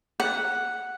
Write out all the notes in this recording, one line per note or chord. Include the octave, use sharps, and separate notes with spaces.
F#5